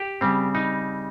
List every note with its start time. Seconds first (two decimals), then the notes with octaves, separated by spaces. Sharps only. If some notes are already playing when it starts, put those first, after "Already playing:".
Already playing: G4
0.21 C#3 G3 C4
0.55 D#4